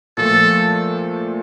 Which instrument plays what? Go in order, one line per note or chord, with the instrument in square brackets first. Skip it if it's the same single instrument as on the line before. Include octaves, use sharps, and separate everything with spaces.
[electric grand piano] A#2 F3 A3 [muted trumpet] A4